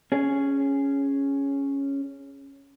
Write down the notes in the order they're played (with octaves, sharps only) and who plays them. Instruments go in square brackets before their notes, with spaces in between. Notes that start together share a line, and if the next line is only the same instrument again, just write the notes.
[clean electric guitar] C#4 G#4